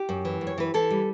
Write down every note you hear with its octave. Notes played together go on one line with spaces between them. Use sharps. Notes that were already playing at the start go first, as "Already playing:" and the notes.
Already playing: G4
F#2
E3
F#2
C#5
E3 B4
E3 A4
G3